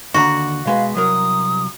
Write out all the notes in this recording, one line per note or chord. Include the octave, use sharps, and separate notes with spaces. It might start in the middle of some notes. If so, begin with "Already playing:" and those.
D#2 D3 F#4 A#5
B2 G#3 B4 F5
C2 F#3 A#4 D#6